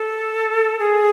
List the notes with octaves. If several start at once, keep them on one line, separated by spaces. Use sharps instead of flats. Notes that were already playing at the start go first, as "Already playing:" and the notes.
Already playing: A4
G#4